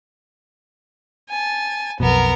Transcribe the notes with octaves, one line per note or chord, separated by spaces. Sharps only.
G#5 A5
B1 F2 B2 B3 A#4